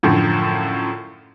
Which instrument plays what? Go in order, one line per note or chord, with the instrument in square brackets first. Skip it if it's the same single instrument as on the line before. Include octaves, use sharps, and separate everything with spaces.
[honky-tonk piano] F#2 A2 D3 F3